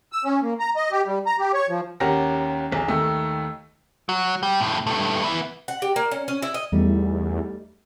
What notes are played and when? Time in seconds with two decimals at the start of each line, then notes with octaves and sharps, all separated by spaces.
0.12 E6
0.25 C#4
0.42 A#3
0.59 A#5
0.76 D#5
0.91 G4
1.06 G3
1.26 A#5
1.39 G4
1.54 C#5
1.69 F3
2.00 D#2 C#4 G4 A#4 F#5 A#6
2.72 B1 E2
2.88 D#2 D#3 A3 E6
4.09 F#3
4.43 G3
4.61 F2 A2
4.87 G2 A3
5.23 B3 E4
5.68 F#5
5.82 G4
5.96 A#3
6.11 C#4
6.28 C#4
6.42 E4
6.54 D#5
6.72 E2 G3 A3 D#4